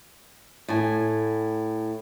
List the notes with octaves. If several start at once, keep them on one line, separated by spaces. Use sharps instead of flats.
A2 G#5